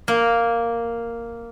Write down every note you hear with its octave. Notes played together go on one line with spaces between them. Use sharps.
A#3